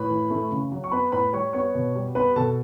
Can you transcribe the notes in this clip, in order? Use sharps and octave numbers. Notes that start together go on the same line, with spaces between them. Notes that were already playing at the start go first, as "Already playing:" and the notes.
Already playing: A2 B4 B5
E3
A3
C#3
F#3
C#6
B3 B4 B5
A2 B4 B5
G3 C#5 C#6
B3 C#5 C#6
B2
G3
B3 B4 B5
B2 A4 A5